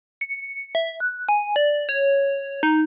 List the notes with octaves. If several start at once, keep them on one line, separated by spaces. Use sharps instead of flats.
C#7
E5
F#6
G#5
D5
C#5
D#4